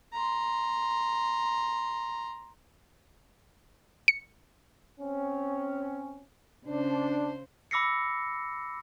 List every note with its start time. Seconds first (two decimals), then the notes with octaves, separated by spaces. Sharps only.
0.13 A#5 C6
4.08 C#7
5.00 C4 C#4
6.66 C#3 C#4 D4 C5
7.71 B5 D6 E6 A#6 C7 C#7